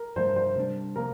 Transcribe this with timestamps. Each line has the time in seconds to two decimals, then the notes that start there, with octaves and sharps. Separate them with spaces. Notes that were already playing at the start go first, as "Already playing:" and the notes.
Already playing: A#4
0.16 G2 F3 A3 C5
0.36 C5
0.56 C3 G3 A#3 D4
0.96 C3 F3 A#3 A#4